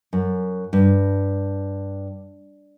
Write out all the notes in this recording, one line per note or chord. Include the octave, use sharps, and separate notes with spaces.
F#2
G2